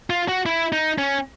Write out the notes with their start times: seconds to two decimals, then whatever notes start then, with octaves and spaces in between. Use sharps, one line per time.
0.10 F4
0.28 F#4
0.46 E4
0.73 D#4
0.98 C#4